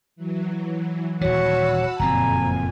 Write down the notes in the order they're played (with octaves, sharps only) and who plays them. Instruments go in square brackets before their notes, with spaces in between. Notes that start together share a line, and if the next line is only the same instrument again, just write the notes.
[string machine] E3 F#3
[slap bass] D#1 E3 [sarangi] F#4 [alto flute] C#5 [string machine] A5 B5 E6
[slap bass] F#1 F3 C4 [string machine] F2 A#2 [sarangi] G#5 [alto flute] A#5